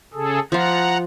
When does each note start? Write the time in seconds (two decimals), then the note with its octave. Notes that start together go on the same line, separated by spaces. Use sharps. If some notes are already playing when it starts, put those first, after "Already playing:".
0.14 C#3 G#4 A4
0.52 F3 F4 F#5 A#5